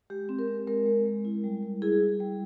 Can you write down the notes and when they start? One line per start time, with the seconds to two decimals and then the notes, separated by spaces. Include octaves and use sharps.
0.10 G#3 G4
0.29 C4
0.39 A#4
0.48 C4
0.67 G#3 A#4
0.86 G#3
1.05 G#3
1.25 E4
1.44 G3
1.63 G3
1.82 E4 G#4
2.01 E4
2.20 G3